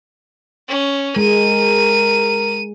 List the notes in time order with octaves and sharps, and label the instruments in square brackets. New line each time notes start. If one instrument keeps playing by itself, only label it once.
[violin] C#4
[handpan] G#3 [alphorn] A#4 [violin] D#7